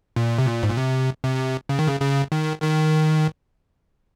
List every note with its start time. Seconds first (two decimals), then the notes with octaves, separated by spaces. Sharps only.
0.16 A#2
0.38 C3
0.46 A#2
0.63 G#2
0.69 A#2
0.77 C3
1.24 C3
1.69 C#3
1.79 D#3
1.88 C#3
2.01 C#3
2.32 D#3
2.62 D#3